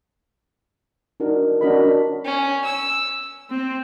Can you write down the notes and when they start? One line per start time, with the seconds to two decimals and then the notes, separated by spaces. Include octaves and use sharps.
1.20 D4 D#4 F#4 A#4
1.61 C#4 D4 F#4 A#4 D#5 B5
2.25 C#4
2.65 E6
3.51 C4